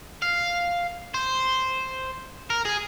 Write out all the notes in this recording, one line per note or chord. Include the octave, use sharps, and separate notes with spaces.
F5
C5
A#4
G#4